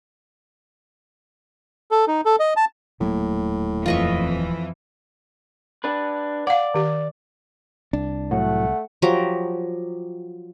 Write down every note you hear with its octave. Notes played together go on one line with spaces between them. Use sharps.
A4
D#4
A4
D#5
A5
D#1 A2 F#3 A#3
F2 E3 F4 D#5 C#6
D4 B4
D5 F5 F#5
D#3 G4
C2 D4
A2 F#3 A3 F#5
F3 F#3 G4 A#5